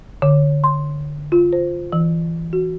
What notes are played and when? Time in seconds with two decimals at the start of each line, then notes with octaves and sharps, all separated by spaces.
0.22 D3
0.64 C6
1.32 F4
1.53 C5
1.93 E3
2.53 F#4